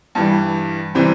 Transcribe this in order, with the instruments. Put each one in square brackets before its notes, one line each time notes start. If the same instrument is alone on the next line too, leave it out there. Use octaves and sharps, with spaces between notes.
[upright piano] G2 E3 G3
C3 E3 G3 C4